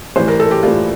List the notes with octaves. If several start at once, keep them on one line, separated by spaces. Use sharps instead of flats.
A2 E3 G3 C5
A#4
A4
G4
A2 E3 G3 F4